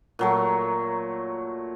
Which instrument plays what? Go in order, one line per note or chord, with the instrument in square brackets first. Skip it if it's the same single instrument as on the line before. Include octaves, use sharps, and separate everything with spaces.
[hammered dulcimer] A#2 F#3 A3